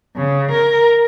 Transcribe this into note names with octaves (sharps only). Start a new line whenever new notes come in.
C#3
A#4